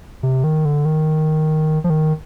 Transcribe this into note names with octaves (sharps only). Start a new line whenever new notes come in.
C3
D#3
D3
D#3
F3
D#3